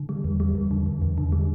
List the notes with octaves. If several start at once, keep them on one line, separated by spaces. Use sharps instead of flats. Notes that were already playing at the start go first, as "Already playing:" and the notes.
Already playing: D3
G3
E2
G3
E2
D3
E2
E2
D3
G3